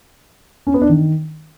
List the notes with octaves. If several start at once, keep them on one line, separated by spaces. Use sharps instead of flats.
C#4
B3
D4
D#3